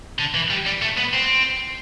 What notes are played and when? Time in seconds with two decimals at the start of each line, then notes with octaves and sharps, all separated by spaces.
0.19 D3
0.34 E3
0.50 G3
0.66 G3
0.82 A3
0.97 B3
1.14 C4